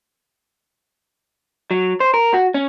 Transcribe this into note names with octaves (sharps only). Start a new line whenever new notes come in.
F#3
C5
A#4
F#4
C#4